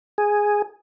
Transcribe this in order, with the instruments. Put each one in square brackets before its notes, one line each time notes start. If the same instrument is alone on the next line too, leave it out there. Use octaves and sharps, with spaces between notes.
[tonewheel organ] G#4